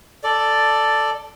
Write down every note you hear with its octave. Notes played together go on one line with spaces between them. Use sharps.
A4 D5